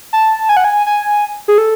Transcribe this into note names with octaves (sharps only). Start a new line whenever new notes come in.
A5
G#5
F#5
G#5
G#5
G#4
A4